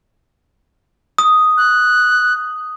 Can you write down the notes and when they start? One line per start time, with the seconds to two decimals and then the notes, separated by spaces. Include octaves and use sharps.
1.18 D#6
1.57 F#6